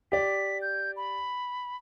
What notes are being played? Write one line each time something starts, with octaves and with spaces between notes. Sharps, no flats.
G4 D5 B6
G6
B5